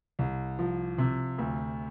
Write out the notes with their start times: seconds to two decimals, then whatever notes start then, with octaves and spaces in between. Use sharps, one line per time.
0.19 C2
0.59 F3
0.98 C3
1.38 D2